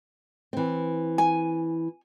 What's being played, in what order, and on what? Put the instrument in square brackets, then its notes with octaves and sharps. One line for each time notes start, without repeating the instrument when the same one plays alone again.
[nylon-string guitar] E3 C4
[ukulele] G#5